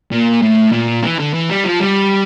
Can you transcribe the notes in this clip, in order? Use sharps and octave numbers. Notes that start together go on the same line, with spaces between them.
A#2
A2
A#2
E3
D3
E3
G3
F3
G3